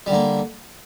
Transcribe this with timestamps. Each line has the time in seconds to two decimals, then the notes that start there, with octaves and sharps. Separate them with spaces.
0.06 G3
0.10 D3
0.13 A#3